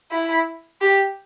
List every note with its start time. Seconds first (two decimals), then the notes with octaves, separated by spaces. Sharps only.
0.11 E4
0.81 G4